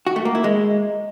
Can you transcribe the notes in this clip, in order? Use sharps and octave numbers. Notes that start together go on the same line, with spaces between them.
F#4
A3
A#3
E4
G#3